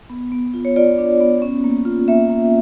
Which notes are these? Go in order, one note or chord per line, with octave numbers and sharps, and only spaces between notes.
B3
B3
F4
C#5
F4 D5
D4
B3
C#4
A#3
F4
A#3 E5
A#3